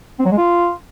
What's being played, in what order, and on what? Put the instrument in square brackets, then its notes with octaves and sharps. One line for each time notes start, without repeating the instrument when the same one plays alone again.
[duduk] C4
F#3
G#3
F4